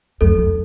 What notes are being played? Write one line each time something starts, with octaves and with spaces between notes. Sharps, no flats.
F2 A4
F2